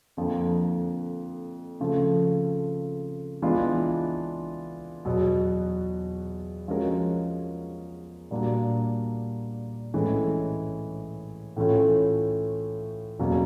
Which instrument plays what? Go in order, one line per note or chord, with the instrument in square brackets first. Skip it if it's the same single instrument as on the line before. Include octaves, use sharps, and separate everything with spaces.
[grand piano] F2 D3 F3 A#3
C#3 F3 A3
E3 G#3 B3 D4 F4
E2 B2 F#3 B3
F3 G#3 C#4 F#4 A#4
A#2 G3 A#3 D4 F#4
A2 E3 G#3 C#4
A2 E3 A3 C#4 F4
E2 B2 F#3 A#3 C#4